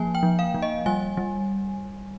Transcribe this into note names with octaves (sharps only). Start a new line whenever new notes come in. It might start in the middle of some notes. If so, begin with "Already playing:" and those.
Already playing: F3 A#3 G#5
G5
F3
F5
F3
D#5
G3 G#5
G3